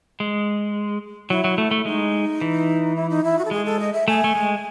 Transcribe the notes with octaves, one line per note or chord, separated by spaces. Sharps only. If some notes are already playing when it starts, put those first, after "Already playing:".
G#3
F#3 E4
F#3
A3
A3
G#3 D#4
E3
E4
D#4
E4
F#4
A4
G#3 G#4
A4
D#5
E5
A3 G#5
A3
G#3